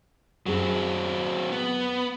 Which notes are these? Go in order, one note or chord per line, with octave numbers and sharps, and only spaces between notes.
F#2 F#3 C4 G#4
B3